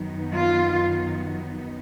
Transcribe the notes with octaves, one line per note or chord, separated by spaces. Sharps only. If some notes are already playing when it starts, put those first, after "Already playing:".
Already playing: F#2 D#3 F#3 B3 D#4
F4